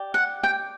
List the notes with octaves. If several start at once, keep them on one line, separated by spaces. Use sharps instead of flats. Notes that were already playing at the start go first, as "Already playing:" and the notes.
Already playing: G4 D5
F#5
G5